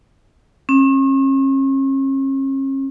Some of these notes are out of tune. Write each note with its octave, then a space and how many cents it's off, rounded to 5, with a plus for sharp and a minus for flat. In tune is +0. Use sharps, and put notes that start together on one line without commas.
C#4 -40